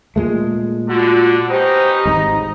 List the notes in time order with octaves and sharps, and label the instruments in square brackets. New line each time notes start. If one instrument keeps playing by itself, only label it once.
[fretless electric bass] A#2 G#3 A3
[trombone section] D3 [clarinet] F4 [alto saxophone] F#4
[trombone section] B3 C#4 D#4 [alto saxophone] G4 [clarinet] C5
[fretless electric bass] G#1 G#2 [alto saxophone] D#5 [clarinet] A#5